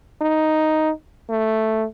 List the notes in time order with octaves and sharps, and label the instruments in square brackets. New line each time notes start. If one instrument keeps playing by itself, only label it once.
[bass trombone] D#4
A3